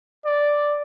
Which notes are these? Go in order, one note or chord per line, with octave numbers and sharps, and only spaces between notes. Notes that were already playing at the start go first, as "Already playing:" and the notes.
D5